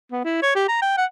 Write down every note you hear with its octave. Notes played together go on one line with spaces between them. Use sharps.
B3
E4
C#5
G4
A#5
G5
F#5